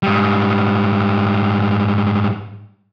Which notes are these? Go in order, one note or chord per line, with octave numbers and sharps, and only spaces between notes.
G#2 G3